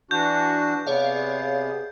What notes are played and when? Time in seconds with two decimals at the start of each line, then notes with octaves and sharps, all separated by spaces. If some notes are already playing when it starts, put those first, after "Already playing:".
0.11 E3 D4 F#4 G6
0.87 C3 B3 G#4 C#5 D5 F5